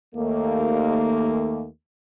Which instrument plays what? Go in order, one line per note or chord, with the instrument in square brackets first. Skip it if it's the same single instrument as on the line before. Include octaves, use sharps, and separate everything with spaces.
[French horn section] D#2 A3 A#3